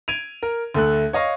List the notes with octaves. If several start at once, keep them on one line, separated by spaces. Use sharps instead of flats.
G#6 D7 D#7 F7
A#4
D2 A3 A4 F#6
C#5 D#5 F5 C#6